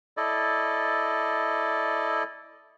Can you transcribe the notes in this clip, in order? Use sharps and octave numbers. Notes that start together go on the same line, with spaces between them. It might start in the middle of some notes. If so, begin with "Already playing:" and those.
E4 A4 D5 D#5